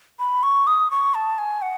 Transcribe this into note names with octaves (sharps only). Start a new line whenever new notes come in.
B5
C#6
D#6
C#6
A5
G#5
F#5